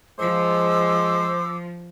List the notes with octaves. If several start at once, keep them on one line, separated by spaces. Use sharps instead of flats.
F3 G#3 C5 D6 E6